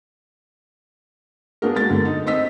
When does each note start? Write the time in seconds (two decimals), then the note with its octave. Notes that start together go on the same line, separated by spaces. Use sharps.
1.62 A#3 B3 D4 F#4 G#4 A#4
1.76 G#3 A6
1.91 D3
2.05 D#4
2.26 C4 C5 D#5 E6 B6